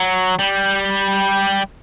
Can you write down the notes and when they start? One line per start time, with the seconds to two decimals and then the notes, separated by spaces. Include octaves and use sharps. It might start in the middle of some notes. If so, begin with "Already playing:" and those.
Already playing: F#3
0.39 G3